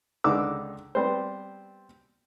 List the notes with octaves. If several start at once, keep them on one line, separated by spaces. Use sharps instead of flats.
C#2 D3 D#4 D6 E6
G3 B3 C4 C5